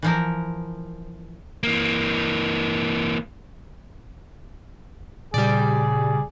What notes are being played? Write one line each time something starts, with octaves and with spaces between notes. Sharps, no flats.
E3 F3 A#4
E3 A#3
A#2 C#3 G3 G#4 D5